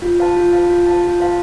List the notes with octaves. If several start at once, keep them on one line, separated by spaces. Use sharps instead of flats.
F4
C5 F5 A5
F4
C5 F5 A5
F4
C5 F5 A5
F4
C5 F5 A5